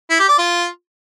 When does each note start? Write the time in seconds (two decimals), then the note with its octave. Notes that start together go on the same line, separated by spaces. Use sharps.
0.10 E4
0.20 G4
0.29 D5
0.38 F4